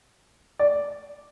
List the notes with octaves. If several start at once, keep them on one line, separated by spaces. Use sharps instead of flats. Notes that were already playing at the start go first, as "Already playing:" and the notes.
D5